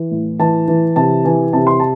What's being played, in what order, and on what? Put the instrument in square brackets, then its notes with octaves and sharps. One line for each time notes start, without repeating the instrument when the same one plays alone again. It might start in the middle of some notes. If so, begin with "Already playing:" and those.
Already playing: [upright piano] E3
A2
E3 A5
E3
C3 A5
E3 G#5
C3 A5
C6
A5